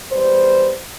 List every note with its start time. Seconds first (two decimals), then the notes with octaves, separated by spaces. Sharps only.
0.12 E2 G3 B4 C5